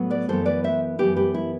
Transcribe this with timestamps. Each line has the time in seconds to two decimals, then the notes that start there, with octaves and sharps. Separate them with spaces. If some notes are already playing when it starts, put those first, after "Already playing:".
Already playing: A2 F#3 B3
0.10 B4 D5
0.29 F#2 E3 B3 A4 C5
0.46 B4 D5
0.64 C5 E5
0.99 F#2 E3 B3 G4 B4
1.17 G4 B4
1.34 E4